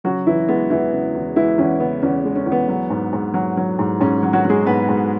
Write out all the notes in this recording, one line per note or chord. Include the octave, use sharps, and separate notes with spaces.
C#3 F#3 F#4
E2 E3 E4
G#3 B3
E2 E3 E4
C#3
E2
E3 G#3 E4
E2 C#4
C#3 B3
E2 C#4
G#3
C#4
E2
B3
F#3
G#2
G#2
F#3
F#3
G#2
G#2 C#4
F#3
F#3 F#4
F#3 G#3 G#4
G#2 B3 B4
G#2